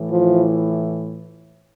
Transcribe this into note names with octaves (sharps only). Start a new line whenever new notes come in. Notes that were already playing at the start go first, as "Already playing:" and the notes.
Already playing: A2 E3
F3